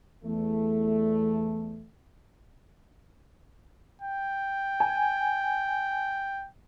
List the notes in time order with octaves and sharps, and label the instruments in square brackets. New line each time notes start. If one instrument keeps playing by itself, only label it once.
[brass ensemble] E2 A3
[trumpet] G5
[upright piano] G#5